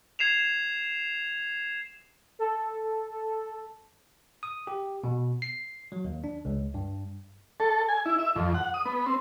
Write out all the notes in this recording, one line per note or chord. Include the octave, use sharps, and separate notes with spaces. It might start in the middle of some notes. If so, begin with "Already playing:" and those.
G#6 C7 E7 F7
A4
D#6
G4
B2
C7
F#3
D#2
D4
C#2
G2
A4
G#5
E4
E5
F2
F#5
D#6
B3
C4